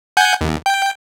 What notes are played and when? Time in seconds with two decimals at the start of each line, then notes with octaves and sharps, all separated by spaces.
0.17 F#5 G#5 G6
0.41 D#2
0.66 G5